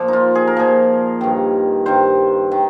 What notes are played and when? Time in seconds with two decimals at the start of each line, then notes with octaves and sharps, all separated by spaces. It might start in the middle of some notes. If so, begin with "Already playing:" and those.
Already playing: A#2 F3
0.08 D#4 F4
0.35 G#4
0.47 A#4
0.57 A#2 F3 G#4
1.21 G2 D#3
1.86 G2 D#3 C5
2.52 D#3